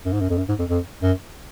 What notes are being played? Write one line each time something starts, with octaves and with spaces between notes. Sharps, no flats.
F#2
G#2
F#2
F2
F#2
G#2
F2
F2
F#2